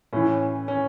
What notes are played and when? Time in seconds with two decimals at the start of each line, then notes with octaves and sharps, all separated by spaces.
0.13 A2 E3 C#4
0.68 C#4